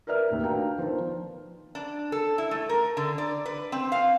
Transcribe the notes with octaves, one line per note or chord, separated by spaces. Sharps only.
A#4 B4 D5 E5 F6
D#2 A2
D4 F#4 B4 F5 G5 A#5
D#3 F3 B3 C5
D4
A4
E4
A3
A#4
D3
D5
B4
C4
F5